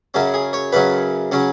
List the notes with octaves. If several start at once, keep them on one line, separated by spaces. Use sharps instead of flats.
F#2 C#3 F#3 C#4
G#4
C#5
F#2 C#3 F#3 C#4 B4
C#3 F#3 C#4